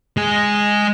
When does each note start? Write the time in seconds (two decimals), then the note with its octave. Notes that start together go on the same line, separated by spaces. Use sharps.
0.17 G#3 G#4